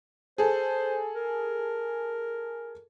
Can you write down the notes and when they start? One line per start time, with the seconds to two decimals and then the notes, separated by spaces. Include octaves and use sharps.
0.38 G#4 A4 C5
1.15 A#4